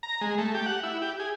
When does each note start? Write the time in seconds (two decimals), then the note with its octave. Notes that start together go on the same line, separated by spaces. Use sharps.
0.03 A#5
0.21 G#3
0.38 A3
0.54 G4
0.66 F#5
0.83 E4
1.02 G4
1.19 G#4